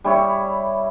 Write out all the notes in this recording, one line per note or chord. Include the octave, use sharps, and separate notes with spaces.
G3 E4 C#5